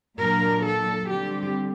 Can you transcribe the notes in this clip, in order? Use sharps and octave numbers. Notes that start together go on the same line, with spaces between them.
A#2 F#3 A#3 D4 A#4
A4
D3 G3 C4 G4